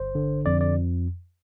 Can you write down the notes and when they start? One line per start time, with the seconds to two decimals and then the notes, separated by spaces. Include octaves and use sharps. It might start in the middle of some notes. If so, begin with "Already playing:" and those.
Already playing: G1 C5
0.15 D3
0.46 F2 D5
0.61 D5